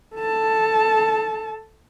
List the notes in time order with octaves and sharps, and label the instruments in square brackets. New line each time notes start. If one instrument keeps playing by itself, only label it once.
[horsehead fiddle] A4 A5